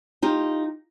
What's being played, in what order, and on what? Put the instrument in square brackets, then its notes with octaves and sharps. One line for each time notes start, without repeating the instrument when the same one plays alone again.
[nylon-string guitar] D#4 F4 G4